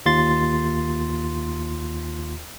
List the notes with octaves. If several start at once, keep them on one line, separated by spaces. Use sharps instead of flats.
D#2 F4 C6 A6